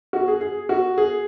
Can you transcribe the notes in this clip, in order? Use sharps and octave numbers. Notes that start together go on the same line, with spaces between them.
F#4
G#4
G#4
F#4
G#4